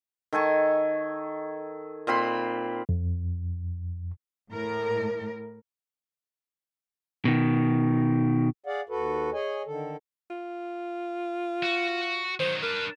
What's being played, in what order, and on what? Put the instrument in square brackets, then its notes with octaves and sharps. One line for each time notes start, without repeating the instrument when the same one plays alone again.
[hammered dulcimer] D#3 A4 G#5 C#6
A#2 C4 B5 C6
[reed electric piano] F2
[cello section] A2 A#4
[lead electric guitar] B2 D#3
[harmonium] G#4 D5 F5 F#5
D#2 F#4 A4 B4
G#4 C#5 D#5 G#5
D3 D#3 A4
[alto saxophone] F4
[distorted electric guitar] F#4
[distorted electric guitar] D#3 F#3 [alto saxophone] C5
[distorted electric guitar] D4 B4 [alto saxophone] A#4